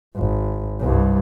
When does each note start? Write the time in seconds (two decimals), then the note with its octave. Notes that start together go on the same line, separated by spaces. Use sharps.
0.16 G#1
0.81 C2 G2